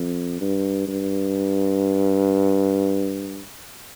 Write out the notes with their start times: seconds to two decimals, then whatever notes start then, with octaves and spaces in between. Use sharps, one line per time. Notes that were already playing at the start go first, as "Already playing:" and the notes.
Already playing: F2
0.41 G2
0.87 G2